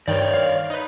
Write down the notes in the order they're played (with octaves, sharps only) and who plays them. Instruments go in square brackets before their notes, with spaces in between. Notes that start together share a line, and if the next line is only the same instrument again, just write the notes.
[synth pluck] G2 D#3 G5 [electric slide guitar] C#5 D5
[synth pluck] F5
D#4 B4